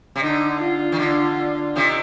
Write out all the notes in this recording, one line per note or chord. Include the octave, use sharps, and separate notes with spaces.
C3
D3 D#4
F4
D#3
D3
C3 D#3